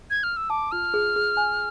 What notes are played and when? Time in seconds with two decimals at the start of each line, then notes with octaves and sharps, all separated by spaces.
0.10 G#6
0.23 F6
0.37 E6
0.50 A5 D6
0.72 F4 F6
0.94 G#4
1.16 G#4
1.37 G#5